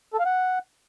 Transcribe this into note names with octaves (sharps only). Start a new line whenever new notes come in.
A4
F5
F#5